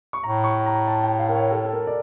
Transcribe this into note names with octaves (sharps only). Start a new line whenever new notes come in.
C#6
A2 A#5
C#6
A#5
A5
G5
F5
A#4
C#5
A4
A4
A#4
D5